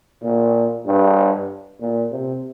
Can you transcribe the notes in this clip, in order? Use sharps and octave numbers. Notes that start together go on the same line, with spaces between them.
A#2
G2
A#2
C3